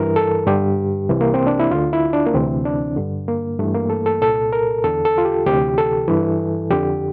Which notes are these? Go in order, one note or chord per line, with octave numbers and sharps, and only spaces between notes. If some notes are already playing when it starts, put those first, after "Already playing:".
Already playing: G2 E3 A#4
A4
G2 D3 G4
C2 C3 E3
A#3
C4
D4
E4
D2 D3 F4
E4
D4
A#3
D2 C3 E3 C4
D4
G2 D3
A#3
G2 E3 A3
A#3
A4
A4
C2 A#2 A4
A#4
E2 D3 A4
A4
F4
G4
D2 C3 E3 G4
A4
G2 E3
F2 D3 G4